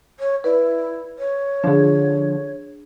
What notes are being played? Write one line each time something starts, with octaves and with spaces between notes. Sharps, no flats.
C#5
E4 B4 D5
C#5
D3 F3 D4 G#4